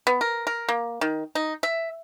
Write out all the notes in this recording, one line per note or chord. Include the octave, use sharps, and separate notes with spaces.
B3
A#4
A#4
A#3
D#3
D#4
E5